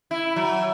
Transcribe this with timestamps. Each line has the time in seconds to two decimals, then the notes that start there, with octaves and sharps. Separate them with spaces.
0.11 E4
0.36 F#3